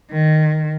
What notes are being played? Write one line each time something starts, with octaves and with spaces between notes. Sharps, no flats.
D#3